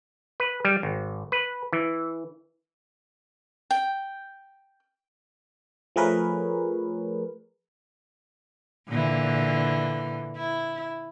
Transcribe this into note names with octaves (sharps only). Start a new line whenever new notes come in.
B4
G3
G#1
B4
E3
G5
F3 A3 G#4 A#4 B4 C#5
A#2 D3 E3
E4